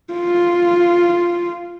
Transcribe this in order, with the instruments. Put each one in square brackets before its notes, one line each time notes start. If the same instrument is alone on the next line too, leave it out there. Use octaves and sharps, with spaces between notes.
[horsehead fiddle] F4